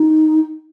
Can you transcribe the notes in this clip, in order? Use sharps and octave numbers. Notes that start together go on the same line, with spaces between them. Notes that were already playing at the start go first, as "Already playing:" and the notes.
Already playing: D#4